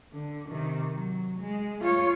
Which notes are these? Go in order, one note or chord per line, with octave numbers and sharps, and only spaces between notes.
D3
C3 D#3
F#3
G#3
F4 C#5